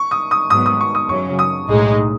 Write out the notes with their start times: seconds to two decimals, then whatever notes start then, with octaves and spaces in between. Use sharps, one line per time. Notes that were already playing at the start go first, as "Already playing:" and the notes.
Already playing: C#6
0.11 D#6
0.31 D#6
0.50 G#2 F#3 B3 D#6
0.66 D#6
0.81 C#6
0.95 D#6
1.09 F#2 C#3 F#3 C#4 C#6
1.39 D#6
1.68 B1 A2 G#3 D#4 G#4